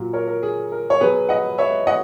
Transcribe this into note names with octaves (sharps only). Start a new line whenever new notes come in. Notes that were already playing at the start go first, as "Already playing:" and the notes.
Already playing: A#2 F#3
A#4 C#5
A#4
G#4
A#4
C#5
B2 F#3 G#4 B4
D#5 F#5
C#5 E5
D#5 F#5